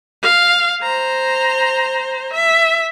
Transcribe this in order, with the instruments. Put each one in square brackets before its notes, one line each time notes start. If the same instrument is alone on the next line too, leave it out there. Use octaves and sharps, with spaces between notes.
[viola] F5
C5 A#5
E5